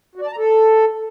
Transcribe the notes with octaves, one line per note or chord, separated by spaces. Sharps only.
F#4
D5
A5
A#5
A4